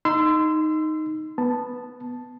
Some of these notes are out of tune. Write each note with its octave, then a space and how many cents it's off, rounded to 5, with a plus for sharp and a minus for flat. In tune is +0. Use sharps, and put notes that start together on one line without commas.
D#4 +0 C6 -25 E6 +20
B3 +0 A5 +0